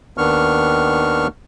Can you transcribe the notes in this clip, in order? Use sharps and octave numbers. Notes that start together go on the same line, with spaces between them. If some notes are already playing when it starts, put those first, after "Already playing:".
D#2 D#3 B3 D4 C#6 F6